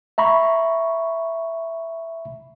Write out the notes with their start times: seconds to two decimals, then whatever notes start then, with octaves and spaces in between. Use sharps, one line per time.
0.18 E5 A#5 B5 C#6